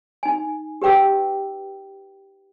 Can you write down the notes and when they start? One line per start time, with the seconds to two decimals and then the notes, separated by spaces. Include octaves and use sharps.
0.23 D#4 G#5
0.82 G4 B4 G5 D6 E6